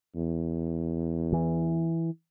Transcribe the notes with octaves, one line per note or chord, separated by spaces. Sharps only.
E2
E3